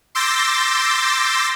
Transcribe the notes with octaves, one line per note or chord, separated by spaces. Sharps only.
C6 D6 E6 G6 A6 A#6